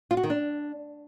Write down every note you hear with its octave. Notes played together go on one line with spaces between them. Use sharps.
F4
F#4
D#3
D4